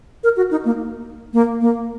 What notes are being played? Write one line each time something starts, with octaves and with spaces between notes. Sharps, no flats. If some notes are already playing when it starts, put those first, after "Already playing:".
A#4
F#4
D#4
A#3
A#3
A#3